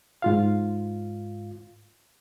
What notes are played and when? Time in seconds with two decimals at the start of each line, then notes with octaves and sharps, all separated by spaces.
0.22 G#2 F4 F5